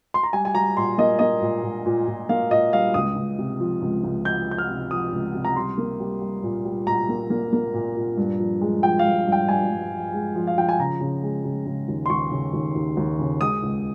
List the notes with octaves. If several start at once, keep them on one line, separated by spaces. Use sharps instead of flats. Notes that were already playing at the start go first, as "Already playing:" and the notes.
C6
A#5
G3 G#5
G#5
G3 A#5
A#2 C6
A#3 D#5
A#3 D#5
A#2
A#2
A#2
A#2
A#3 F5
A#2 D#5
G3 F5
C#2 D#6
C#2
C3
F3
C#2
C#2
F3 G6
F3 G6
F6
C3
F3 D#6
C#2
C3
A#5
G3 C6
A#3
G3
G3
A#2
G3
A#2 A#5
A#3
A#3
A#3
A#2
A#2
G2
F3
G#3
F3 G5
F5
G2
G2
G5
G2 G#5
G2
F3
G#3
F3
F5
F3 G5
G#5
C#3 A#5
C#3
G#3
C#3
C#3
D#2
C6
D#2 C#6
C#3
D#2
D#2
D#2
C#3
G#3 D#6
C#2